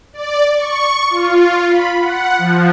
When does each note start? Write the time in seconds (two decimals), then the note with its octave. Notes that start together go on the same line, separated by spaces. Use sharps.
0.13 D5
0.55 C#6
1.10 F4
1.69 B5
2.00 F#5
2.39 F3